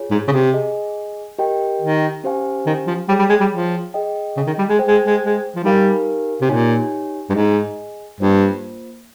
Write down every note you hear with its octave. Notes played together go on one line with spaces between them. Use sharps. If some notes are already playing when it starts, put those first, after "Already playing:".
Already playing: F4 G#4 C#5 G#5
G#2
C#3
C3
G#4 D#5 G#5
G4 A#4 D#5 G5
D#3
C#4 G4 C5 F5 G#5
D#3
F3
G3 G#4 C#5 G5
G3
G#3
G3
F3
G#4 D#5 G5
C#3
D#3
G3
G#3
G#4 C5 G5
G#3
G#3
G#3
F3
G3 D#4 G4 A#4 F5 G#5
C3
A#2 D#4 G4 C#5 G#5
G2
G#2 G#4 D#5 G#5
G2 A#3 F4 C5